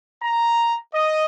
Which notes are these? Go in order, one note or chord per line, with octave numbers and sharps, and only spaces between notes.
A#5
D#5